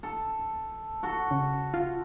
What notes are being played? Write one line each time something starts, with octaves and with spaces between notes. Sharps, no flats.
A4
F#4 A4
C#3
F4